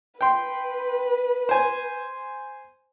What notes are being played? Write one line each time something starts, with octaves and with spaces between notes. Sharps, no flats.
B4 G5 C6
C5 G#5